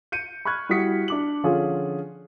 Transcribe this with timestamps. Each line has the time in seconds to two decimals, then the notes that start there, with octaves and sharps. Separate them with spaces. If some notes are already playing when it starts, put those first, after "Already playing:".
0.12 G6 C#7 D#7
0.45 B5 C#6 F6 F#6 G#6
0.69 G3 E4 F#4 D#6 B6 C#7
1.08 D4 D6 F#7
1.44 D3 F3 C#4 F4 G#4